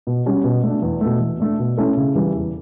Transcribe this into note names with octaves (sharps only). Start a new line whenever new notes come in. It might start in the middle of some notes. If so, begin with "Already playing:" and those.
B2
G3 C#4 F#4
B2
A3 D4
E2
B2 A3
E3
A3 D4
B2
A3 C#4 E4 A4
C#3
E3 G3
E2